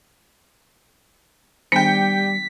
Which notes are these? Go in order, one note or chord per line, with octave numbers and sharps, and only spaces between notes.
D#3 G3 B3 D4 G5 B6 C#7